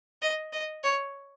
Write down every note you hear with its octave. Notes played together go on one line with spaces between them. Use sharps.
D#5
D#5
C#5